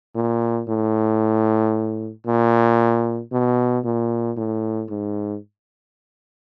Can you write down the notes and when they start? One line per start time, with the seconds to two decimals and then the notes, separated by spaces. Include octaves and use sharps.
0.15 A#2
0.68 A2
2.27 A#2
3.32 B2
3.84 A#2
4.37 A2
4.90 G#2